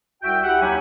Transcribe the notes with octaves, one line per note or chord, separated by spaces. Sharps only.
C2 F#4 E5 G5
E4 G4 E5 F#5
D#2 F#3 D#4 E4 G4 G#5